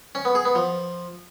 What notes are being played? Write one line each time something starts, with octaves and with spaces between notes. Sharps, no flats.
C#4
B3
G#4
B3
F3